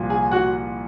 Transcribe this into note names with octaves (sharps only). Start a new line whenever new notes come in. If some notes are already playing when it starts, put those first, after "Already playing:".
Already playing: C2 A#2 F3
G#4 G#5
F#4 F#5